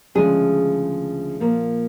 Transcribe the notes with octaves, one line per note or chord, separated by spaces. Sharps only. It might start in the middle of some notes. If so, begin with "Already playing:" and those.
D2 C#3 F3 G#3 G#4
A#2 F3 A#3